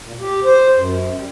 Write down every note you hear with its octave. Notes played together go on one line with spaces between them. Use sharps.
A#2
G4
C5
F#2
G3